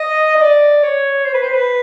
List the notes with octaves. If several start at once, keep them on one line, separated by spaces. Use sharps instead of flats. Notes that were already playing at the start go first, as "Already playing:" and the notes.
Already playing: D#5
D#5
D5
C#5
C5
B4
C5
B4